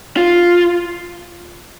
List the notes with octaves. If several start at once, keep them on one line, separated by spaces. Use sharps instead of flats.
F4